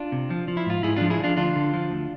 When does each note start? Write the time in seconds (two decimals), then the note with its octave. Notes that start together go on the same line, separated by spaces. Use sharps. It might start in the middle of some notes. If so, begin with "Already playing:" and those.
Already playing: D4 F4
0.12 C3
0.30 F3
0.48 F3
0.57 E4
0.66 G#2 F4
0.83 G#2 E4 G#4
0.97 F3 D4 F4
1.10 E4 G#4
1.20 F3 D4 F4
1.37 D2 D4 F4
1.56 D3
1.74 F3
1.91 D2